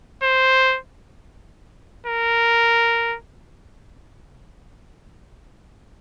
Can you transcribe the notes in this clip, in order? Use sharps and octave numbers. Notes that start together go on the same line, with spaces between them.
C5
A#4